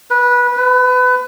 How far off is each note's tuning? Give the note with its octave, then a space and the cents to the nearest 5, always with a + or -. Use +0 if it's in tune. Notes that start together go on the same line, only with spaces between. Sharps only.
B4 -15
B4 +25